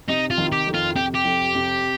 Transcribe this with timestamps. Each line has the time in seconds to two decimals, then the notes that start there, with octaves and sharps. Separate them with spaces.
0.09 C3 D#4
0.31 F4
0.38 D#3
0.52 G4
0.67 F2
0.74 F4
0.96 C3 G4
1.15 G4
1.25 F2
1.55 C3